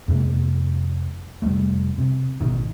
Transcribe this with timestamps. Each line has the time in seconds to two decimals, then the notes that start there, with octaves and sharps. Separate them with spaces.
0.08 F2 C3 G#3 A#3
1.42 F1 F#2 G3 A3
1.98 C3
2.41 A1 B2 D#3